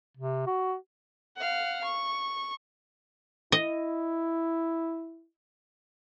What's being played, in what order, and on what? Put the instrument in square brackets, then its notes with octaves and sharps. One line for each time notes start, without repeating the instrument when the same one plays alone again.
[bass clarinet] C3
F#4
[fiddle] F5 F#5
C#6
[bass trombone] E4 [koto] D#5